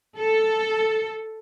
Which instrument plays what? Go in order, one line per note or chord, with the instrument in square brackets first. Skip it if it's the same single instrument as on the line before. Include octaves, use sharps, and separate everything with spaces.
[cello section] A4